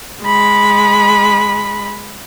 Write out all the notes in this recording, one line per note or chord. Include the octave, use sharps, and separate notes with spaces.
G#3 B5